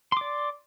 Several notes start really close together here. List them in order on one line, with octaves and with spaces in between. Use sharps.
C6 D6 D5